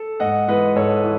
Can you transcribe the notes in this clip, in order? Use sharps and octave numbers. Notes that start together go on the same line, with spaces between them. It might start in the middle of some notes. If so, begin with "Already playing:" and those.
Already playing: A4
G#2 D#5 F#5
E3 G#3 B4 D#5
G#2 A4 C#5
E3